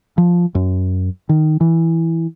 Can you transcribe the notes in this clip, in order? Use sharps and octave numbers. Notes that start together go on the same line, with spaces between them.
F3
F#2
D#3
E3